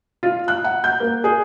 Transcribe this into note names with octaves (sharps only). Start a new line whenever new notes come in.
F4
F#6
F#5
G6
A#3
G#4